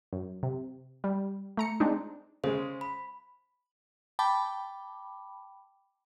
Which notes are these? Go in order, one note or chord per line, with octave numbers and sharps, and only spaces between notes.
F#2
C3
G3
A3 A#5 C#7
G#3 C4 D4 D#4
C#3 G#3 C5
B5
G5 A5 B5 D6